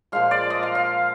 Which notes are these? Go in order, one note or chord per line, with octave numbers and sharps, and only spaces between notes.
A#2 F3 G#3 F5
D5
D#5
F5
F5